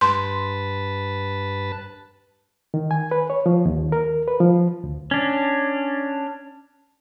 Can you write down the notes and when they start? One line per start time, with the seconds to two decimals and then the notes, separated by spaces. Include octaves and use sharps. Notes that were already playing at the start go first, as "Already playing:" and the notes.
0.01 G2 B4 A5 C6
2.74 D#3
2.91 G#5
3.11 B4
3.30 C#5
3.46 F3
3.65 D#2
3.92 A#4
4.28 B4
4.40 F3
4.84 D2
5.11 C#4 D4